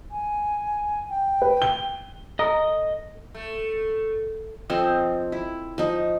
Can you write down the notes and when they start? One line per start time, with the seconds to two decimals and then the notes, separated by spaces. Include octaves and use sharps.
0.11 G#5
1.10 G5
1.42 B4
1.62 G7
2.39 A4 D#5 A#5 D#6
3.35 A3
4.70 F3 C4 A4 D#5
5.32 E4
5.78 F3 D#4